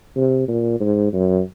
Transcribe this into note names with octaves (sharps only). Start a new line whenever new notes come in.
C3
A#2
G#2
F#2